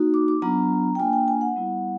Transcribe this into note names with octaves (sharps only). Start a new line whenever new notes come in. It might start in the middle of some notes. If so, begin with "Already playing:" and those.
Already playing: A#3 D#4 F#4
D6
D6
F#3 B3 D4 F4 A#5
G5
A#3 D4 F4 G#5
G5
G#5
F#5
G3 B3 E4